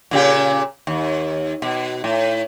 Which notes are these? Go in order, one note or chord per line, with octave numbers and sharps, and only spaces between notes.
A#2 C#3 G4
D#2
B2
A2